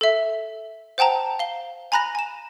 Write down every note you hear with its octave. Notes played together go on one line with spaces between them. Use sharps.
A4 E5
C5 F#5 G5 A5 A#5
F5 G7
G#5 A#5 B5 F#6 A#6 F7
G#5 E7